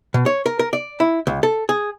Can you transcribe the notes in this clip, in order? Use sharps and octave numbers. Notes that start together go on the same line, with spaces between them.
B2
C#5
A#4
A#4
D5
E4
C#2
A4
G#4